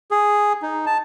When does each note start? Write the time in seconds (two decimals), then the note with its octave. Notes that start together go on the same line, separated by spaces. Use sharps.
0.11 G#4
0.63 D#4
0.86 A5